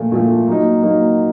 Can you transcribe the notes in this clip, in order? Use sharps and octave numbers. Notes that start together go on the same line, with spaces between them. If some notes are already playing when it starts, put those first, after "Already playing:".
Already playing: A#2 F3 A3
A#2 F3 A3
F#3 A#3 D#4
F#3 A#3 D#4